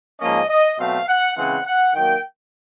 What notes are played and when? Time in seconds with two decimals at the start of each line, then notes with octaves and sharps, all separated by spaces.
0.19 G#2 F3 A#3 C#4 D#5
0.49 D#5
0.78 B2 F#3 A3 C4 F5
1.08 F#5
1.36 C#3 E3 G#3 C4 F#5
1.65 F#5
1.94 D#3 F#3 A#3 G5